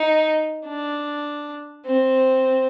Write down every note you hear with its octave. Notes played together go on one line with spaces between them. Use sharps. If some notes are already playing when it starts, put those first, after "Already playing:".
Already playing: D#4
D4
C4